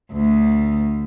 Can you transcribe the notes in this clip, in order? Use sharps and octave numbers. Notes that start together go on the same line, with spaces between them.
D2